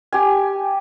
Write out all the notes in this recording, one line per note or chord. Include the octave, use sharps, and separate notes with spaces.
G4 G#5